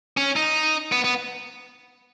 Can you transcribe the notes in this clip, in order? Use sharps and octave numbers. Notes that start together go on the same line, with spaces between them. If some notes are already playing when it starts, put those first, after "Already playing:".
C#4
D#4
B3
B3